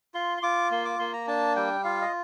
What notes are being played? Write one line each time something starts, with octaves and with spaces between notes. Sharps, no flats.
F4 C6
C6
F4 D6
A#3 C6
D6
A#3 C6
A#5
D4 A5
G3 G5
F4 F5
D#5